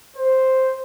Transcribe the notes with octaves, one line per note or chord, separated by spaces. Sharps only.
C5